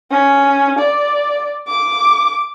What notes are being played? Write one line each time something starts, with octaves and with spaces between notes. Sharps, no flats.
C#4
D5
D6